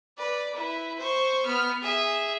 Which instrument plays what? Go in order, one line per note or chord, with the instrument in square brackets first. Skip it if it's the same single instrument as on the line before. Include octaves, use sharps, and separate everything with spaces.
[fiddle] B4 D5
E4 B4
C5 C#6
B3 F6
G#4 E5